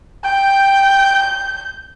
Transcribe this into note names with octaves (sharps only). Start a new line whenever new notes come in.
G5 G6